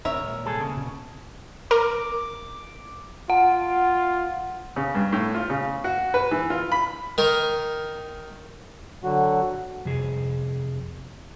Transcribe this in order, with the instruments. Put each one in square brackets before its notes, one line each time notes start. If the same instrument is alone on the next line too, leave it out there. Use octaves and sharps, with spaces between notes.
[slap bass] D1 D2 C4 [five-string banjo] A#4 C#5 E5
[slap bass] A#2 D#3 G#3
[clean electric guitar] C2 G#4 A4
[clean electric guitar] C#3 [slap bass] A#3 C4 C#4
[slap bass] A#2
[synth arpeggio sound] A#4 [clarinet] D6
[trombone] F4 [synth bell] F#5
[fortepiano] C#3
G2
A2
F4
C#3
F#4
B4
E3
F4
B5
[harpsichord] D#3 A#4
[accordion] D3 F#3 F#4
[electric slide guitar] F2 C3 G#4